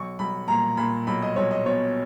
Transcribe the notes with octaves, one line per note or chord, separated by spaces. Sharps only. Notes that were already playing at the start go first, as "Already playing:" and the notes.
Already playing: B1 C#6
B1 B5
A#2 A#5
A#2 B5
B1 B5
D#5
B1 C#5
D#5
B2 C#5